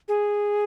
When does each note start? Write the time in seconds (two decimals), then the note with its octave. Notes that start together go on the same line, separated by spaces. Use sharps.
0.08 G#4